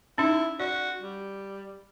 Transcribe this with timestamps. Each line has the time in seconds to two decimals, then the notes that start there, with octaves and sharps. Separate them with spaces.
0.18 C#4 D#4 E4
0.60 F#4 D5
1.01 G3